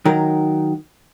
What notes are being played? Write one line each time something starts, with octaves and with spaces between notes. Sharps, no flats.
D#3 F#3 A#4